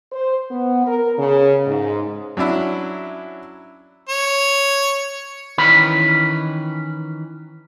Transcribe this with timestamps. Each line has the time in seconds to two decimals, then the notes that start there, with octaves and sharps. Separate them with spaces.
0.12 C5
0.51 B3
0.87 A#4
1.19 C#3
1.67 G#2
2.37 F#3 C#4 D4 E4
4.09 C#5
5.58 D#3 E3 C#4 B4 B5